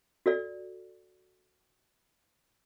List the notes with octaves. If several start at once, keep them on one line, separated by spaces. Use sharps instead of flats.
F#4 A4 D5